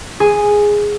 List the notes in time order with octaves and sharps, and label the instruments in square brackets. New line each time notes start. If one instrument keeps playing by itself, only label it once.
[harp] G#4